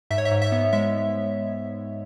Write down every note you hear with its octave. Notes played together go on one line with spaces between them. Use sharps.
G#2 E5
C#5
E5
G#2
E5
B3
G#3 E5